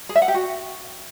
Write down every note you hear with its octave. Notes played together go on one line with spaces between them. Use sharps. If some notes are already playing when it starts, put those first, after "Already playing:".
G#4
E5
F#5
G4
F#4